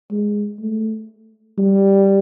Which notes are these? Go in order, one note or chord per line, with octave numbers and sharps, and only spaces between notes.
G#3
A3
G3